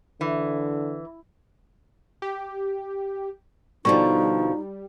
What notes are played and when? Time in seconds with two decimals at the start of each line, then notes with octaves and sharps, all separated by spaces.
0.21 D3 E3
2.22 G4
3.85 B2 D3 F3 G3 D#4 C#6